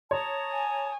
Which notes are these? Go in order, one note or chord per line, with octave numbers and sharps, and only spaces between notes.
C#5 A5 A#5 D#6
G#5